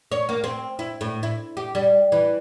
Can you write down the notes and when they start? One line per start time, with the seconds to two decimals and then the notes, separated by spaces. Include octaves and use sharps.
0.12 C#5
0.29 A#3
0.44 C4
0.79 E4
1.01 A2
1.23 E4
1.57 G4
1.75 G3
2.12 E3